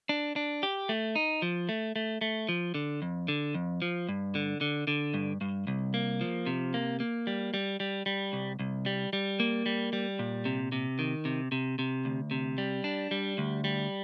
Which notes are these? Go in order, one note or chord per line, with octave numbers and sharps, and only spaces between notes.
D4
D4
G4
A3
D#4
F3
A3
A3
A3
F3
D3
F2
D3
F2
F3
G2
D3
D3
D3
G2
G2
C2
A#3
F3
C3
A#3
A#3
G3
G3
G3
G3
C2
C2
G3
G3
A#3
G3
G3
A#2
C3
C3
D#3
C3
C3
C3
D2
C3
G3
D4
G3
D2
G3